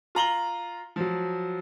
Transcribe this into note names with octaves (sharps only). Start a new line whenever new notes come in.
F4 A#5 F#7 G7
F3 F#3